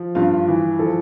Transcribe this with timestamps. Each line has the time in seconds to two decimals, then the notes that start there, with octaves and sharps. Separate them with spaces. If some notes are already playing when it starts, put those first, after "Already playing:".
Already playing: F3
0.15 G2 F4
0.33 F4
0.48 E3
0.79 F3 A4